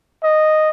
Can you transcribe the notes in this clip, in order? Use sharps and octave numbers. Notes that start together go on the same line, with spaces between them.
D#5